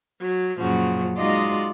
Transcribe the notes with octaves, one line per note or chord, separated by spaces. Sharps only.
F#3
F#2 A#2 C#3 F3 F#4
G#3 D#4 F4 F#4 D5 D#5